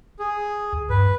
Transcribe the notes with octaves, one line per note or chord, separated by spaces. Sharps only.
G#4
D2
G2 B4